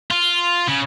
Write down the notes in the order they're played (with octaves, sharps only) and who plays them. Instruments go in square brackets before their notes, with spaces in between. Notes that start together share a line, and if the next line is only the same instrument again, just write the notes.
[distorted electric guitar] F4
C#3